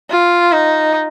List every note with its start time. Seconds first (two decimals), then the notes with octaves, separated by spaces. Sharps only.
0.11 F4
0.52 D#4